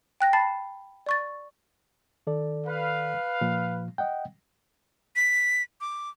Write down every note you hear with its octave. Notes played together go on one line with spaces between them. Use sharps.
G5 F#6 A#6
A5 B5 A6 C7
D5 C#6 A6
D#3 A4 D5
B4 F5
A#2 F3
D#5 F#5 G5
B6
D6